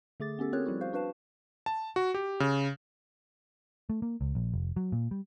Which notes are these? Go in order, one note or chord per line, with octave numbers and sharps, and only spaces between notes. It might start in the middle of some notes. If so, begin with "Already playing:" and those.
D3 A3 G#4 D6 A6
B3 C#4 G4 A4
C4 F4 G#4 A#4 C#5 F#6
F3 G3 E4 F#4
F#4 C5 F5
D4 F#4 B4 F5 A5
A5
F#4
G4
C#3
A3
A#3
C#2
A#1
F1
F#3
A#2
G3